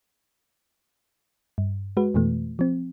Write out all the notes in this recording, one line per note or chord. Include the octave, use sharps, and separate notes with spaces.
G2
G#3 F#4 B4
F2 B2 E3 A3
F3 C4